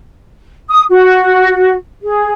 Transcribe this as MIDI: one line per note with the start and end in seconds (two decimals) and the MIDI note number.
0.69 0.83 87
0.89 1.74 66
2.03 2.32 68